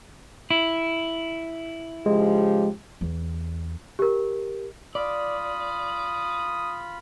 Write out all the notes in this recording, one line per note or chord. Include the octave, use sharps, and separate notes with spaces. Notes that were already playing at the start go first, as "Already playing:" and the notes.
E4
C#3 F3 G#3 G4
E2
G4 A#4
F4 D5 B5 D#6